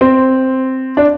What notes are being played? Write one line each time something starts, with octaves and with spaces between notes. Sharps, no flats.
C4
D4